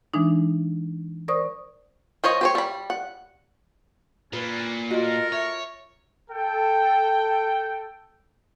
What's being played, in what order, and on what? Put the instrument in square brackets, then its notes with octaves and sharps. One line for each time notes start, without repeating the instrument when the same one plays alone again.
[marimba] E3 G#3 D4 D#4
A#4 C5 D5 C#6 D#6
[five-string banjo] F3 C5 C#5 D#5
G4 C5 C#5
G3 B5
F#5
[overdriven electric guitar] A#2 [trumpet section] G3 C#4 D4 [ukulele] B4
[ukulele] F4 F#4 [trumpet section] A4 A#4 [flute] D#5
[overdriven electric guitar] C#5 [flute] E5
[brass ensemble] A4 G5